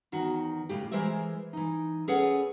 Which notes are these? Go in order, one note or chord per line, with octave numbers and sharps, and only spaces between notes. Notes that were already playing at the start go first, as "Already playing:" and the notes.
E2 D#3 F#4
A2 C#3 G4
E3 G#3 A#4 C5 D#5 E5
E3 D#4
C#4 G#4 A4 B4 C#5 F#5